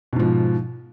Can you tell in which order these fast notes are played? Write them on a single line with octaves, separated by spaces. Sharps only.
B2 G#2 F3